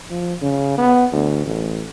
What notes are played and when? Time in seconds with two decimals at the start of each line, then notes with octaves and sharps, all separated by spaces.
0.10 F3
0.42 C#3
0.78 B3
1.12 D2
1.45 A1